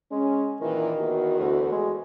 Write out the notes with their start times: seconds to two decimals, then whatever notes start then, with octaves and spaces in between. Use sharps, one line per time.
0.12 G#3 C#4
0.61 A#2 D#3 E3
0.99 E2 F#4
1.40 D2
1.72 G#3